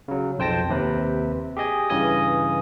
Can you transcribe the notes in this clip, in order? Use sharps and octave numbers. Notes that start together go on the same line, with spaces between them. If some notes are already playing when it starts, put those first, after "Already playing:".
C#3 F#3
B1 F2 C5 G5 A5 A#6
D#2 C3 B4
G4 G#4 D#5 G#5
G2 C#3 E3 D#5 G#5 D#6